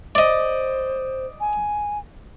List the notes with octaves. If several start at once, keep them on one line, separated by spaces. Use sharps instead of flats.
C5 D5 D#5
G#5